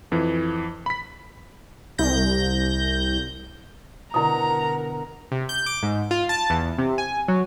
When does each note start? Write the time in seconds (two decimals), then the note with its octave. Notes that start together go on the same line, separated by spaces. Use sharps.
0.12 F2 E3
0.86 B5 B6
1.98 C2 G6 A#6
4.14 B2 D3 E4 A#4 F#5 A#5 D#6
5.32 C3
5.49 G6
5.66 D6
5.83 G#2
6.11 F4
6.29 A5
6.50 E2
6.78 C3
6.98 G#5
7.28 F#3